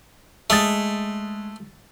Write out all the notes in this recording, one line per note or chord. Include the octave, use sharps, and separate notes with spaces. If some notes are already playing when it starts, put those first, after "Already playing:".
G#3 A3 D#6 A6